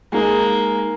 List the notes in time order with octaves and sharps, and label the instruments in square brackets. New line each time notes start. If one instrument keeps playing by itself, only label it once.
[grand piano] G#3 D#4 G#4 [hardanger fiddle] A#3